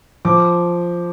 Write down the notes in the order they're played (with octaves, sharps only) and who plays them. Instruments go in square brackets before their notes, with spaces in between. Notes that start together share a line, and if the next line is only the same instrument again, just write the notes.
[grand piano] F3 D6